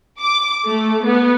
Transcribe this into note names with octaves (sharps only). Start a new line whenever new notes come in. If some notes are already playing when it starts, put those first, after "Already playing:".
D6
A3
B3